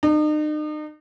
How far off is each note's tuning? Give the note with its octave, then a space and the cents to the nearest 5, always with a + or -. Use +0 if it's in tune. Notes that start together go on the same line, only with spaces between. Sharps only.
D#4 -40